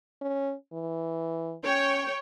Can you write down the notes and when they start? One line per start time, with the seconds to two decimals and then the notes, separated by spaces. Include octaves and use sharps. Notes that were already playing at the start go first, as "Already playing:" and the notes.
0.22 C#4
0.73 E3
1.64 C#4 C#5 G5